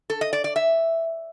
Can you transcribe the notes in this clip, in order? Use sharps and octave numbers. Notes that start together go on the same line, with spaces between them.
A4
D#5
D5
D5
E5